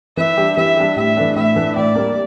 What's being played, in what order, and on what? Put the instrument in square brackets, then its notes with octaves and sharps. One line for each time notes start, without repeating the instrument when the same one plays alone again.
[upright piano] E3 [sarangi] E5
[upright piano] G3 D4 G4
[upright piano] E3 [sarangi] E5
[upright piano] G3 D4 G4
[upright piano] A2 [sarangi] E5
[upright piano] E3 A3 D4
[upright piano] A2 [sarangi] E5
[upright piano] E3 A3 D4
[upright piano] A2 [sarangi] D5
[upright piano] G3 A#3